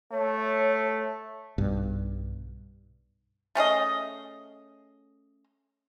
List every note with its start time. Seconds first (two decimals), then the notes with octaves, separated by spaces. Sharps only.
0.12 A3 C#5
1.58 B1 G2
3.55 A3 C#4 G#4 D#5